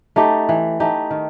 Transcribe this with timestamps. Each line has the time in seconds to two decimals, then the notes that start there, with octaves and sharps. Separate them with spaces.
0.16 A3 D#4 G4
0.49 E3
0.80 A3 D#4 G4
1.11 D#3